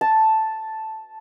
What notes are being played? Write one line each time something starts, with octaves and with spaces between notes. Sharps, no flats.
A5